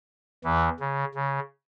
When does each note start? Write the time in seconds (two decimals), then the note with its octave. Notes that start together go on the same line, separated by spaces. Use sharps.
0.44 E2 E3
0.80 C#3
1.15 C#3